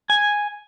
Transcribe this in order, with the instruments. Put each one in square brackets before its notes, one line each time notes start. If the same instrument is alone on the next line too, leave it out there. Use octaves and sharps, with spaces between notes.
[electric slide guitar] G#5